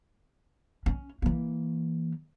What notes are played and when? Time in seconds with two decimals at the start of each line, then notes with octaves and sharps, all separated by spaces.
0.86 C#4
1.22 E3 A#3